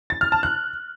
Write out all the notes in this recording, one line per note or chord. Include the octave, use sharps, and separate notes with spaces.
A6
F6
A5
F#6